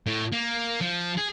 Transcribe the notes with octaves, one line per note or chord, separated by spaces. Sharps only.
A2
A#3
F3
G#4